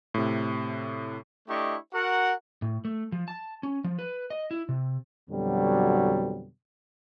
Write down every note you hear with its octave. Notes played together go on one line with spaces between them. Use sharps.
A2 C3
A3 D4 E4 G4 D#5 C#6
F#4 A#4 F#5
A2
A3
F3
A5
C#4
F3
B4
D#5
E4
C3
F2 B2 D3 F#3 G3